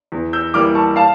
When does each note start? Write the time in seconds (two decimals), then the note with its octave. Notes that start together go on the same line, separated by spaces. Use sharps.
0.12 E2
0.33 E6 G6
0.54 E3 G3 A#3 D6 F6
0.75 A5 C#6
0.96 F5 A5